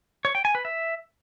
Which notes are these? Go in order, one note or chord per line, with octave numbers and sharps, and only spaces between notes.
C#5
G5
G#5
B4
E5